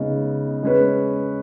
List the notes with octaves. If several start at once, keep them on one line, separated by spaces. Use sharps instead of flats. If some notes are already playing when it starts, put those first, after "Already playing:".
Already playing: C#3 G#3 B3 D#4
G#3 C#4 B4